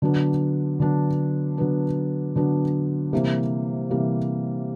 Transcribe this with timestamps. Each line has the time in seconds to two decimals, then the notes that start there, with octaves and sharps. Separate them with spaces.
0.02 D3 F#3 B3 D4
0.80 D3 F#3 B3 D4
1.58 D3 F#3 B3 D4
2.36 D3 F#3 B3 D4
3.13 C3 E3 G3 A#3
3.91 C3 E3 G3 A#3